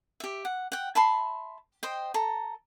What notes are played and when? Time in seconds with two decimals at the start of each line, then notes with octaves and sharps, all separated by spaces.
0.20 G4 E5
0.45 F#5
0.72 F#5 G5
0.95 E5 A5 B5 C6
1.83 C5 D#5 G5
2.14 A4 A#5